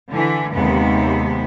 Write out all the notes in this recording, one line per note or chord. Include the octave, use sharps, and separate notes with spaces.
D3 E3
D#2 C3 G#3 B3